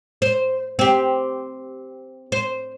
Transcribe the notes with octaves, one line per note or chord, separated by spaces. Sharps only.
C5
C4 G4
C5